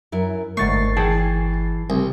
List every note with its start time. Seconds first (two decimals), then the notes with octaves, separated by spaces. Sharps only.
0.12 F#2 E4 A#4
0.57 G1 D#2 G#2 D3 A3 C#6 A6 C7
0.97 E3 G#4 G5 A5
1.90 C2 C4